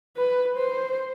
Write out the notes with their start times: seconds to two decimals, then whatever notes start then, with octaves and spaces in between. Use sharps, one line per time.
0.17 B4
0.57 C5